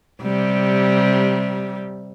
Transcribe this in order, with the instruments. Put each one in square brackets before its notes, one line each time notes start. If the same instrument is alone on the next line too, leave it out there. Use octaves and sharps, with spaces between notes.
[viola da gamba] C3 G3